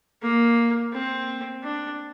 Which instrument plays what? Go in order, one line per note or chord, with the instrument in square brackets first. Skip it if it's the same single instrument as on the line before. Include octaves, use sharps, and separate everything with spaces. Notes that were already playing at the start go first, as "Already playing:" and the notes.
[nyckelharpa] A#3
C4
D4